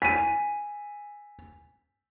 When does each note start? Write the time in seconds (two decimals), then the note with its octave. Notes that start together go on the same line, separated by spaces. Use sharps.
0.02 G#5 B6 D#7